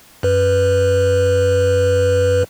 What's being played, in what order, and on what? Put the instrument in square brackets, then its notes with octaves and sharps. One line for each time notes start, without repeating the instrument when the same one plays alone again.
[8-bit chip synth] F#2 B4